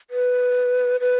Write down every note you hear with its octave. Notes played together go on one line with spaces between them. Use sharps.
B4
B4